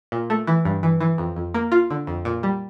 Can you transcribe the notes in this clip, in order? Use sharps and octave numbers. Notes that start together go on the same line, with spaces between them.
A#2
A3
E3
G2
E3
E3
F2
F2
A#3
F4
D3
F2
A#2
G3